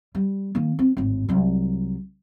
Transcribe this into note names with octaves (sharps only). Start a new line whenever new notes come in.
G3
D#3 A#3
C4
G#1 A2
C2 F#3